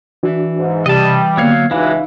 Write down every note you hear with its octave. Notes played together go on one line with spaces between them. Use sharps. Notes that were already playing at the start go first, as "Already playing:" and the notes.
E3 D4 F#4 D5
G#2
C3 G3 D#5 A5
D3 F#3 A#3 B3 C#5 F5
C#2 E3 G#3 D4 D#4 F#4 F5 B5